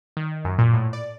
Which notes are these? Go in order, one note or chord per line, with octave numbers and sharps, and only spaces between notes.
D#3
F#2
A#2
A2
D5